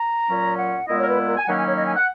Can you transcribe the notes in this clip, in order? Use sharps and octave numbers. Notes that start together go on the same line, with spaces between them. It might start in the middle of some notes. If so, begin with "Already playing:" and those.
Already playing: A#5
A#2 F#3 C#4
F#5
A#2 G#3 B3 E4 D#5
C#5
A#4
B4
A#4
G#5
D#3 F#3 A#3 C#4 E4 F#5
G#5
C#5
D#5
G#5
F#5